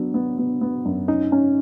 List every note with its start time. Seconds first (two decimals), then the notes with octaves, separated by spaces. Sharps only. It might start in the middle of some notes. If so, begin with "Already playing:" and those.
Already playing: F#3 B3 D4
0.14 B3
0.38 B3
0.61 B3
0.85 F#2
1.08 C#4 D#4
1.32 C#4